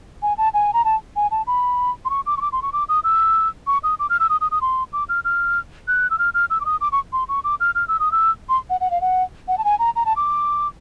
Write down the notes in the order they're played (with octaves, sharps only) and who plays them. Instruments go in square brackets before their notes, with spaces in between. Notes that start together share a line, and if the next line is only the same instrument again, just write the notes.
[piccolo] G#5
A5
G#5
A#5
A5
G#5
A5
B5
C6
C#6
D6
C#6
D6
C6
C#6
D6
D#6
E6
C#6
D#6
D6
F6
E6
D#6
D#6
D#6
C6
D6
F6
F6
F#6
E6
F6
F6
E6
D6
D#6
D6
C#6
C6
C#6
D6
F6
F6
E6
D#6
E6
C6
F#5
F#5
F5
F#5
F#5
A5
G#5
A#5
A#5
A5
D6